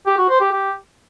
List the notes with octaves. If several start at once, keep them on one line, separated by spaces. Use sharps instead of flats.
G4
F#4
C5
G4
G4